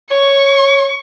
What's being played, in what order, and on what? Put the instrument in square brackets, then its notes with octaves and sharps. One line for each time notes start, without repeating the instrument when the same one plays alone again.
[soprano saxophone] C#5 [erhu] C#6